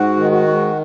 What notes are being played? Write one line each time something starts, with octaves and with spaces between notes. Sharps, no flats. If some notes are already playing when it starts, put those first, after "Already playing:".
Already playing: G#2 F#4
D#3
F#4
G#2